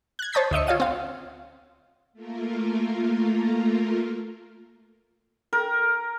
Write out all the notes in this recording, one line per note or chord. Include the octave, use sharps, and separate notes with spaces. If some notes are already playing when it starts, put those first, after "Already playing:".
F#6 G#6
C5 C#5 A5 D#6 G6 B6
D2 D#5 E5 C#7
F4 C#5 F5 D#7
C4 F5
A3 A#3 F4 A#4
A#4